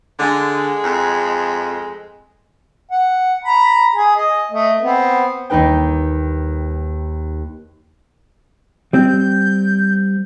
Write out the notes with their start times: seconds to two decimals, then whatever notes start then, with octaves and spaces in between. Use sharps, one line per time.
0.19 D3 G#3
0.84 F2
2.91 F#5
3.45 A#5 B5
3.95 G#4 G#5
4.16 D#5
4.52 A3 D#5
4.81 B3 C4 B4
5.50 D#2 G3 D#4 B4 G5
8.93 G3 C4 G6